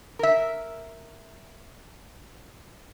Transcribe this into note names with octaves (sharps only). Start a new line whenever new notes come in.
A#4 E5